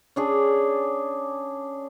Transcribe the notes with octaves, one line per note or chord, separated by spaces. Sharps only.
C#4 D4 G#4